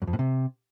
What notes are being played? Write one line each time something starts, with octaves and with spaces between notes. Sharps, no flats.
F#2
F2
A2
C3